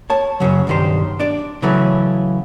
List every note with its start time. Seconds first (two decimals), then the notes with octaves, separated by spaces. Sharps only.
0.10 C#5 A5
0.40 F#2 A#2 C#3 F#3
0.67 B1 G2 D#3 G4 C5
1.19 D4 D5
1.62 C#3 E3 F#3 A3 C#4